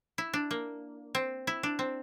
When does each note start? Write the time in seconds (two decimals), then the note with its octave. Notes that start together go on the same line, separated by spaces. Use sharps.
0.18 E4
0.33 D4
0.51 A#3
1.15 C4
1.47 E4
1.63 D4
1.79 C4